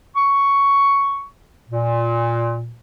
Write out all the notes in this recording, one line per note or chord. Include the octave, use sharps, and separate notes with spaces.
C#6
A#2